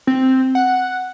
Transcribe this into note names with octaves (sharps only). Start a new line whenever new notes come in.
C4
F#5